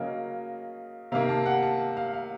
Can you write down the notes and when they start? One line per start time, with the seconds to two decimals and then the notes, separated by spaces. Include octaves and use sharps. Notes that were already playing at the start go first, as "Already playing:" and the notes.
Already playing: C#3 F#3 A#3 D#5
1.12 C3 D#3 A#3 F5
1.29 A5
1.46 F#5
1.62 A5
1.97 F5
2.13 F5